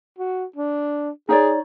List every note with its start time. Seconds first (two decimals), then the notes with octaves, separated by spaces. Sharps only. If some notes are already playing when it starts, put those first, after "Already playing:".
0.19 F#4
0.56 D4
1.29 D#4 G#4 C#5 D5